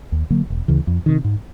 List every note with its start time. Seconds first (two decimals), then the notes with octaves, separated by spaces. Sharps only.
0.12 D#2
0.30 D3 F#3 A#3
0.50 E1
0.68 D2 C#3 E3
0.87 F2
1.06 C3 D#3
1.24 G#2